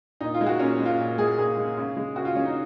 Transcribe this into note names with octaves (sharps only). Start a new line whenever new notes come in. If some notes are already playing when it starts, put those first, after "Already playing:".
A#2 D#4
F4
G#3
F#4
A#2 C#4
G#3
F4
A#2
G#3 G#4
A#2 G#4
G#3
C#3
G#3
C#3 F#4
F4
G#3 C#4
D#4